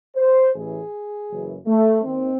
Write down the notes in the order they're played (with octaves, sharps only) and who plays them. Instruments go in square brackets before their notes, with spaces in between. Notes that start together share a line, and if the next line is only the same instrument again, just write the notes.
[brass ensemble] C5
A1 A2 E3 G#4
F#1 F#2 E3
A3
D#2 D#3 C4